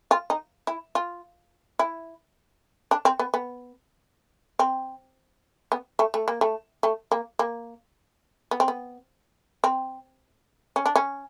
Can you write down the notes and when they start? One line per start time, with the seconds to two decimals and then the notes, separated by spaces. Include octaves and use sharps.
0.11 F4
0.30 D#4
0.67 E4
0.95 F4
1.79 E4
2.91 D4
3.05 C4
3.19 B3
3.34 B3
4.59 C4
5.72 B3
5.99 A3
6.14 A3
6.28 A#3
6.41 A3
6.83 A3
7.12 A#3
7.39 A#3
8.51 B3
8.60 C4
8.68 B3
9.64 C4
10.76 C#4
10.86 D4
10.95 C#4